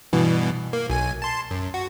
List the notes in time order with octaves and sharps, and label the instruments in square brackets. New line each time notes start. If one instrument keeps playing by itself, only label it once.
[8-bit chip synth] G2 B2 E3
A#3
B1 G#5
A5 C6
F#2
F#4